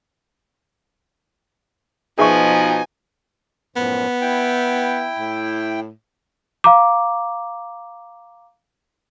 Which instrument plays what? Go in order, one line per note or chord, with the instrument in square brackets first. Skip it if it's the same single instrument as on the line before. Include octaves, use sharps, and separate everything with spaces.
[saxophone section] B2 D#4 [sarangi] F3 [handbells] G#4 E5 C#6 [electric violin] G#5
[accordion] F#2 A2 F3 [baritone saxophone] B3
[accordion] E4 G5
[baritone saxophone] A2
[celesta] F5 A#5 D6